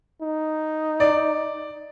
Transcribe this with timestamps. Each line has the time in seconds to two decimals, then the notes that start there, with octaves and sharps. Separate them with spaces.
0.22 D#4
1.00 D5